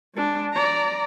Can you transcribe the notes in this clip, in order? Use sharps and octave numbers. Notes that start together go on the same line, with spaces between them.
G#3 D4
D5 A#5